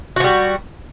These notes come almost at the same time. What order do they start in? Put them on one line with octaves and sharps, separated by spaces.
F#4 F3 G3